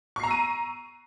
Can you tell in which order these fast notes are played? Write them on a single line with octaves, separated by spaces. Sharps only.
C#6 C7 A#5 E6 D#7